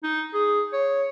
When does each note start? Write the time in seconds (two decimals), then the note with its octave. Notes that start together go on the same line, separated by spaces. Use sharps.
0.03 D#4
0.34 G#4
0.73 C#5